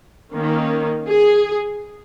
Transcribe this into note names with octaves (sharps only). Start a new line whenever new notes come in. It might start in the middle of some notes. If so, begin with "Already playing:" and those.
D#3 A#3 C#4
G#4